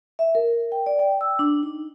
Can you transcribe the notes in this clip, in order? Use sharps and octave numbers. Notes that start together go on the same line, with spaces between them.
E5
A#4
G5
D5
G5
E6
D4
D#4